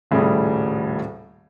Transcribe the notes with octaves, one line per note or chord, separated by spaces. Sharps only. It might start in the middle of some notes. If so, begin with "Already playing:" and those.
D#1 A2 C#3 G3 G#4